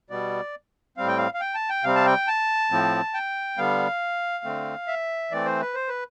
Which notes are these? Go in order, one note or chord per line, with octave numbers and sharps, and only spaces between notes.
B2 G3 B3 D5
A2 G3 C4 F5
G5
F5
F5
G5
A5
G5
C3 G3 C4 F5
A5
G5
A5
A2 F3 C4
G5
D3 G3 B3 F5
D3 A3 C4
E5
E3 A3 C4 D5
C5
B4
C5
B4